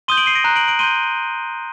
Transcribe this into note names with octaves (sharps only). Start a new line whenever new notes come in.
C6 D#6 G6 D#7 G7
D7 F#7
C7 D#7
A#6 D7
A#5 F#6
D7 F#7
D7 F#7
C6 G6 D#7 G7